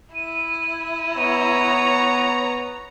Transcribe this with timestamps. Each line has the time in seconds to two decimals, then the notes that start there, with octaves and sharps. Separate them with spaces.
0.15 E4 D#7
1.17 B3 C#5 A#5